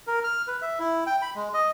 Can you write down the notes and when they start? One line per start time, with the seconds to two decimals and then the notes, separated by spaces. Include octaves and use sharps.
0.07 A#4
0.24 F6
0.47 B4
0.62 E5
0.79 E4
1.07 G5
1.22 B5
1.35 G#3
1.54 D#5